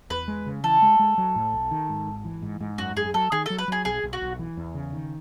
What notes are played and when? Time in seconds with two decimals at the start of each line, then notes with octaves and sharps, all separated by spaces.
0.10 E2 B4
0.28 G#3
0.46 C#3
0.64 E3 A4
0.82 G#3
0.99 G#3
1.18 F#3
1.36 A2
1.53 B1
1.71 D#3
1.89 G#2
2.07 G#1
2.25 E3
2.42 G#2
2.61 G#2
2.78 F#2 F#4
2.96 F#2 G#4
3.14 F#3 A4
3.32 D#3 G#4
3.46 F#3 A4
3.58 B4
3.68 F#3 G#4
3.85 B1 G#4
4.03 B1
4.13 F#4
4.21 B1
4.39 E3
4.57 E2
4.75 C#3
4.93 D#3